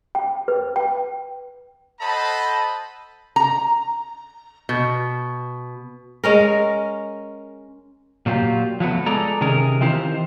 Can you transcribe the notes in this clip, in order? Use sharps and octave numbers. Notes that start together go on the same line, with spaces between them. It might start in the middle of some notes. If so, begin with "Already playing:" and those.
G5
B4
G5
A4 C5 D#5 F#5 A5 B5
A#5
B2
G#3 C#4 A#4
A#2 F#3 F4 G4
F3 F#3 A3 B3
G#3 G#4 A4 D5 A#5
C3 D#3 C#4 G#4 A#4
D#3 E3 C4 F4 G4 C5